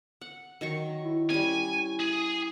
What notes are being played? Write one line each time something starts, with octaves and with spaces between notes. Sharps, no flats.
F#5
D#3 F#3 C#6
E4
G3 C#4 G#5
G#4